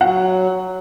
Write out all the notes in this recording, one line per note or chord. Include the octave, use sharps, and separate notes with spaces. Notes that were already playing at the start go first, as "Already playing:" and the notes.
F#3 F#5